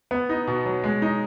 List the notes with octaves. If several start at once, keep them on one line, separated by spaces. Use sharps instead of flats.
B3
D#4
B2
F#3
G#3
D#4